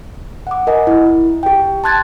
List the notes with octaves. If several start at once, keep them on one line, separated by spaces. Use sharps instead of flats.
F#5 D6
A#4 D#5 F#5 G#5
E4
G4 G5
A5 C6 F#6 G#6 A6